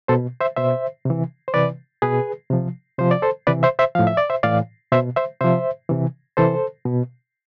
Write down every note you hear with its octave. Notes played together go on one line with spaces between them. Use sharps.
B2 A4 C5
C5 E5
B2 C5 E5
C3 E3
C5
C3 E3 B4 D5
B2 G#4 B4
C3 F3
C3 F3 C5
D5
A4 C5
C3 E3 B4 D5
C5 E5
C5 E5
A2 F3 F5
E5
D5
C5 E5
A2 E3 D5 F5
B2 C5 E5
C5 E5
C3 F3 C5 E5
C3 E3
C3 E3 A4 C5
B2